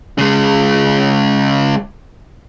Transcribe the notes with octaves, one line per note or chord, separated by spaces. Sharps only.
C#3 G#3